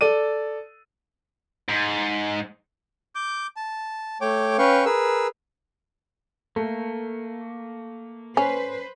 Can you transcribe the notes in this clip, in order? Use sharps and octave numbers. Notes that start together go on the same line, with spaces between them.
A4 D5 D#7
G#2
D6 G6
A5
A3 C#5 G5 D6
C#4 B4 F5 G5 C#6
G#4 A#4 B4 E6
A3 A#3
C#4 B4 C5